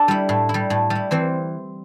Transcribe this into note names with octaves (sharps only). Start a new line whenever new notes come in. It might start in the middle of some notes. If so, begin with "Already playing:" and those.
Already playing: D4 A4 D5
G3 E4
A2
E4
G3
A2
G3
E4
E3 C4 C5